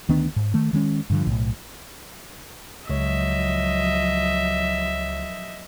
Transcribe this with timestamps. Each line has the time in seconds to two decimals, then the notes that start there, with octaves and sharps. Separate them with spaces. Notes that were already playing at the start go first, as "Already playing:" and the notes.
0.09 D2 D#3 B3 D4
0.36 G#2
0.54 D#3 A3
0.73 D#3 G#3 C#4
1.10 G2 D3 F3
1.27 B1 A2
2.90 C#2 F3 F#3 C#5 D#5 E5